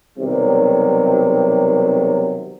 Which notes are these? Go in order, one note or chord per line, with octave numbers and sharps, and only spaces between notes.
B1 C3 D#3 F#3 G3